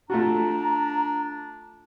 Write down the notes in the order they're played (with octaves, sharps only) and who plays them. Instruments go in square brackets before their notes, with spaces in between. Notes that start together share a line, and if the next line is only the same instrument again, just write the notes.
[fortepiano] A3 F4 F#4 [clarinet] D4 [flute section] A#5